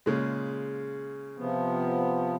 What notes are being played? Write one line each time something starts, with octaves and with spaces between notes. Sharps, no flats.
A#2 C#3 G#3
C3 F3 B3